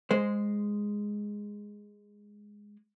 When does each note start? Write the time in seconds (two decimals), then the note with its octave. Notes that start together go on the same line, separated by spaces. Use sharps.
0.11 G#3 C5